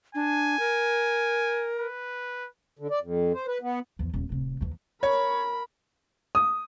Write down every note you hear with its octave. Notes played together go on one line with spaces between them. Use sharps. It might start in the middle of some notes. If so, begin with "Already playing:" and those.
D4 G#5
A#4
B4
D3
D5
F2
C5
B4
B3
E2 F3
D#1
D1 C3
D#2 E3
A#4 C#5 B5
D#6